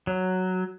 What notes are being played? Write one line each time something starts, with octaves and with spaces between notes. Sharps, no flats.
F#3